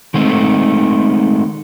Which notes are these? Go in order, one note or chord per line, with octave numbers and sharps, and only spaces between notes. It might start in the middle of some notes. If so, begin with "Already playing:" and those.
D#3 G#3 A3 C4